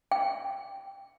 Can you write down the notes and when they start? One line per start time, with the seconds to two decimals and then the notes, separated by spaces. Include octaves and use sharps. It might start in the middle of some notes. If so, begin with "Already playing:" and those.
0.12 G5